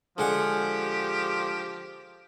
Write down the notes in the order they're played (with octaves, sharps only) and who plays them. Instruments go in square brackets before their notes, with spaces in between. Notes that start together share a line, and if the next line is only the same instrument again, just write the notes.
[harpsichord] D3 G#3 F#5 [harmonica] F3 G4